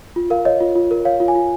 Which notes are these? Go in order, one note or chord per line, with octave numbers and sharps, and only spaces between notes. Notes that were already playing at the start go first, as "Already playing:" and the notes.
F4
A#4 F5
C#5 D#5
F4
F4
A#4
C#5 F5
F4
G#5
F4